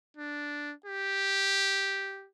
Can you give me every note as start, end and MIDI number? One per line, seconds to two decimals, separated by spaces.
0.17 0.73 62
0.86 2.27 67